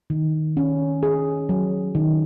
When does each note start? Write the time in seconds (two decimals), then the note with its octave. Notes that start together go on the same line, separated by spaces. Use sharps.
0.10 D#3
0.57 C#4
1.03 G#4
1.49 F#3
1.95 D#3